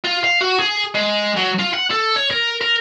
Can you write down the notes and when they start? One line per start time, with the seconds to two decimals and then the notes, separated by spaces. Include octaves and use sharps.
0.04 F4
0.24 F5
0.41 F#4
0.59 G#4
0.94 G#3
1.37 F#3
1.59 F4
1.74 F#5
1.91 A4
2.16 C#5
2.31 A#4
2.61 A#4